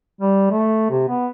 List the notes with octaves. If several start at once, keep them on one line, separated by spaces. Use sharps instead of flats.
G3
A3
C3
B3